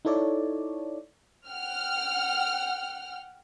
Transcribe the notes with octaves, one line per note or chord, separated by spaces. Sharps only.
D#4 E4 A4 C#5 D5
F#5 G5 F6